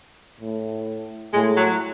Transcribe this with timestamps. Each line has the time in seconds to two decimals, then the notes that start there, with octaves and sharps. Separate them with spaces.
0.40 A2
1.33 A2 G#3
1.57 F#3